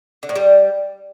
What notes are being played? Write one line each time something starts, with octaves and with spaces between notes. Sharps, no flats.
D3
A2
G3